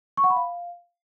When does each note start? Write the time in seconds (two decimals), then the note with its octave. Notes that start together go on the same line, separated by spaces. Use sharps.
0.17 C#6
0.24 F#5
0.30 B5
0.36 F5